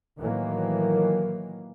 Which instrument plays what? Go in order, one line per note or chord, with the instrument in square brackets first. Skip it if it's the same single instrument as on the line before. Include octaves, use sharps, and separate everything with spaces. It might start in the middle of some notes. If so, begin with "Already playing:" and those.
[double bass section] A2 D#3 E3 F#3 A#3